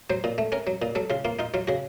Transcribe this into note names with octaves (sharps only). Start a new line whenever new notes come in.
F#3 C5
A#2
A3
C#4 A#4
F#3
A#2
F#3 A4
C#3 F4
A#3 F4
D#4 F4
F#3 F4
C#3 F#4